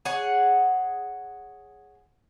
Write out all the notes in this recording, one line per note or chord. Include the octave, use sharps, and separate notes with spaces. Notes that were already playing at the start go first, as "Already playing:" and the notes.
G#4 C#5 F#5